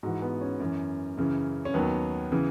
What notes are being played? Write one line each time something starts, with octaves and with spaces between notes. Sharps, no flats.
G#2 E3 F#4
B3
C#4
F#2 E3
F#2 C#3 E3
C#4
D#2 D#3 F#3 B3
C#3 E3